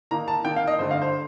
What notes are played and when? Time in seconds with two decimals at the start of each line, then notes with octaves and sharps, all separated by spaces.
0.11 D#3 A#3 D#4 A#5
0.28 A5
0.45 D#3 A#3 D#4 G5
0.56 F5
0.67 D#5
0.79 G2 D3 A3 C5
0.91 F5
1.02 C5